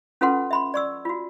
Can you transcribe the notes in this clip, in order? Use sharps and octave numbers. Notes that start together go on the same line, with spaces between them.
C#4 F4 A4 B4 F#5 C6
E5 B5 C6
D5 C#6 E6
F4 F#4